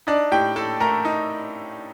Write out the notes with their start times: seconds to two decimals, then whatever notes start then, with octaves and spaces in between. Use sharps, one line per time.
0.07 D4 D#4 D5
0.32 A2 G4 G5
0.56 A2 A4 A5
0.80 A3 A#4 A#5
1.05 D#4